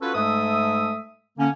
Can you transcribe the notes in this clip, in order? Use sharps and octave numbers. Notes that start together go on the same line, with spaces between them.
C#4 F4 F#4 A4 B4
G#2 G#3 A3 A4 E5 D#6
D3 A#3 C#4